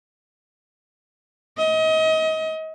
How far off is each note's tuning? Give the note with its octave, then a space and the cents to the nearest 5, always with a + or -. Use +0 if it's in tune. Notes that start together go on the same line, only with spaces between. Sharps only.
D#5 +30